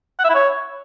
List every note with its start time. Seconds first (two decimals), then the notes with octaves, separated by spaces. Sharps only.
0.19 F#5
0.24 E5
0.29 E4
0.35 C#5